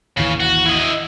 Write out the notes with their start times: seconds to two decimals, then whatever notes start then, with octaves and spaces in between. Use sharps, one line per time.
0.17 G#1 D#2 C#3 E3
0.40 F#4
0.66 E4 D#5